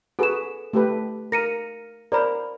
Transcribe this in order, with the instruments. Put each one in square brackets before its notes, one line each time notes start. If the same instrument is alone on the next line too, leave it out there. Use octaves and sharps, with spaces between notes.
[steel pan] F#4 G#4 B4 [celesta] A4 E7
[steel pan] A3 G4 B4
[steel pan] A#4 [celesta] A#6 C#7 D#7
[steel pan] A#4 C5 [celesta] D5 B5